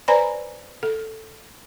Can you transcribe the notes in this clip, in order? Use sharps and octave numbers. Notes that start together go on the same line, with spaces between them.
B4 C5 D5 G#5 A#5 B5
A4